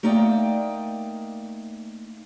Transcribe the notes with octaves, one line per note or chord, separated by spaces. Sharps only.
A3 A#3 D#4 D5 G5